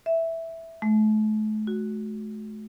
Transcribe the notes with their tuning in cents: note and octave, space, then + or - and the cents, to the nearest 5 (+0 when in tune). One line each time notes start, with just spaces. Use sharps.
E5 +0
A3 -40
F#4 -5